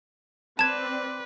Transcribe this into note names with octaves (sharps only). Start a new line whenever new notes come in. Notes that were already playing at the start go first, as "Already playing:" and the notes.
C4 B4 D5 A5 G#6 E7